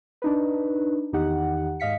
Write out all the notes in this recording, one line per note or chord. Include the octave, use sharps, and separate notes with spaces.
D4 D#4 B4
E2 D#3 D#4 G4 F#5
G#2 D#5 F5 B6 C#7